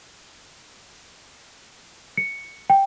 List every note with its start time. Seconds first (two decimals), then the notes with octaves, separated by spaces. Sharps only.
2.17 C#7
2.70 G5